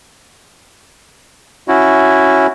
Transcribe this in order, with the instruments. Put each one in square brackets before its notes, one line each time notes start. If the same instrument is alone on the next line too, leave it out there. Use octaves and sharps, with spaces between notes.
[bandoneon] C#4 E4 F#4